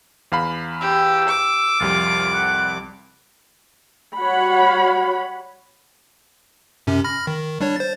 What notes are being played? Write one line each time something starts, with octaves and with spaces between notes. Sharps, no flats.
E2 F5 B5
G4 E6
D6
C2 F2 G3 F4
F#5
G3 F#4 C#5 F#5 B5
F#2 C3 C#4
B5 F6 A#6
D#3
G3 D4 C#5
C5 A6